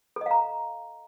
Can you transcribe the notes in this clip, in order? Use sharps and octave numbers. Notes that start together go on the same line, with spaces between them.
A4 D#5 F5 A#5